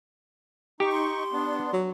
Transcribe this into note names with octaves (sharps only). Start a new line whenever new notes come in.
D#4 G4 C#6
C6
B3 D4
F#3